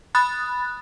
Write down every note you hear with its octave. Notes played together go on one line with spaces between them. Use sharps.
B5 D#6 F#6 A6